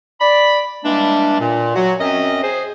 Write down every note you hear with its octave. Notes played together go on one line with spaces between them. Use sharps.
D5 B5
E3 G3 G#3 A#3 D4
A#2
F#3 F#4
F#2 C4 C#4 D#5
G#4 C5